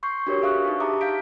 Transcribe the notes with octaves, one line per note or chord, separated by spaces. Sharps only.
C6 C#6 G6 C7
D4 F#4 G4 A#4 B4 C#5
G#4 E5 F5 C#6 D#6 F#6
D4 D#4
G4 E5 A5 A#5 D6 D#6
F5 G6 B6 D7